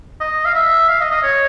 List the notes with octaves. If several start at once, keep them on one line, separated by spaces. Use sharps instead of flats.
D#5
F5
E5
F5
D#5
D#5
C#5